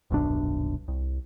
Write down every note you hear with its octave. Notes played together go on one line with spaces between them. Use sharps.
D#1 B1 F#2 D4
C2